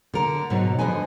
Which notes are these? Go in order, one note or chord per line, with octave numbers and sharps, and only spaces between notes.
D3 A#4
G#2 B2 F#3
D3 F3 G#3 B4 G#5